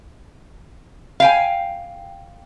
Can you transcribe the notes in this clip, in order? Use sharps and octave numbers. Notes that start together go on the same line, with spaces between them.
F5 G5 G#5